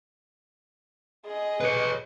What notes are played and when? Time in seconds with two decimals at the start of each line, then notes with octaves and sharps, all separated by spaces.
1.26 G#4 D#5
1.61 B4 C#5